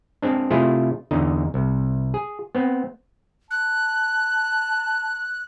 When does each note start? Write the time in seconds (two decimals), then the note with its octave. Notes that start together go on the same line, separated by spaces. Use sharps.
0.22 G#3 C4 D4
0.51 C3 A3 E4 F4 G#4
1.11 E2 D3 D#4
1.54 C2
2.14 G#4
2.55 B3 C4
3.51 A5 F#6